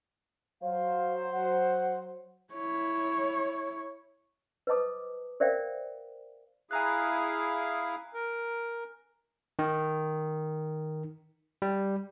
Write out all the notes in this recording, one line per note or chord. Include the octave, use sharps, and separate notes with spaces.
F#3 C5 F5
F#5
E4 C#5
B4 C5 D#5 A5 D6 D#6
A#4 C5 D5 E5 F5 G5
E4 G#4 F5 G#5 A#5 F#6
A#4
D#3
G3